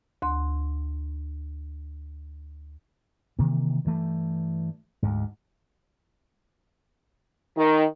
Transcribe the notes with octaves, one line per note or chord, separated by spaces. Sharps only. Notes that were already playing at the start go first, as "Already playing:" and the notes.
D2 C6
C3 D#3 E3 A#3
G2 E3 A3
D2 G#2
D#3